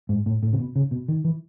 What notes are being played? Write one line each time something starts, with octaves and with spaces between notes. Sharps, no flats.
G#2
A2
A2
C#3
B2
C#3
B2
D#3
E3